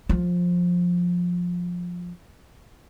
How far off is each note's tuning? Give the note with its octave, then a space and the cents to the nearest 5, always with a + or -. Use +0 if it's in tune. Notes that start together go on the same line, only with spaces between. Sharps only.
F3 +15